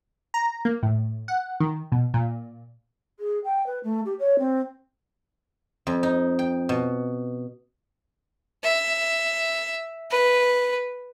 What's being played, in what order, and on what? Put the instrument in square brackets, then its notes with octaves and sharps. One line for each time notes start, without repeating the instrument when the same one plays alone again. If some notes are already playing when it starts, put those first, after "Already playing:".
[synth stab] A#5
A#3
A2
F#5
D#3
B2
A#2
[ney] G#4
G5
B4
A3
G4
C#5
C4
[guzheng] F2
D#4
G5
B2
[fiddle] E5
B4